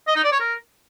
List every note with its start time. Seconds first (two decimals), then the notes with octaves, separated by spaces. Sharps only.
0.08 D#5
0.16 D#4
0.24 D5
0.32 C#5
0.40 A#4